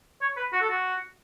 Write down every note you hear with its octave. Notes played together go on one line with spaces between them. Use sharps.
C#5
B4
F#4
A4
F#4